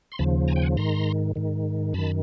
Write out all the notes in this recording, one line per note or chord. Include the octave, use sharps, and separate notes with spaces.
C6
D#2 C#3 F3 A5 B5
G#5 A#5
G5
F#5 G#5
G#2 D#3 A#5 C6
G#2 D#3
F#2 D#3 A5 B5